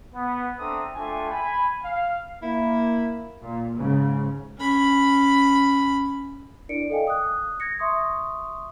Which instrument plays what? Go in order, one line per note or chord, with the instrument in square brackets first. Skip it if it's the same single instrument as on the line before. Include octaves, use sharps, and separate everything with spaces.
[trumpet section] B3
C4 D4 A4 E5 A#5 D#6
A3 D4 F4 A4 G5 G#5
G#5 B5
F5
[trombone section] A#3 [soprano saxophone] E4
[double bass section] A#2
G#2 C#3
[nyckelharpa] C#4 B5
[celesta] D4 E4 A#4 D5 C#7 D7
A4 D5 D#5 F5 G5 G#5
D#6 F#6
G#6 A#6 C#7
E5 C6 C#6 D#6